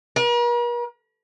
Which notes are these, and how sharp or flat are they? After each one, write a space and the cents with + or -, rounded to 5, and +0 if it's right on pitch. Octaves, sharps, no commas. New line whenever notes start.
A#4 +45